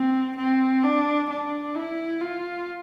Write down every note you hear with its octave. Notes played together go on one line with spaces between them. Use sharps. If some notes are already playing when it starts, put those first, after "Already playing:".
Already playing: C4
C4
D4
D4
E4
F4